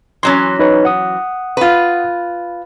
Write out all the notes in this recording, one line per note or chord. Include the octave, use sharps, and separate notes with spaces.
E3 F#3 C#4 C6
D#4 B4 C#5
F#5 D#6
F4 B4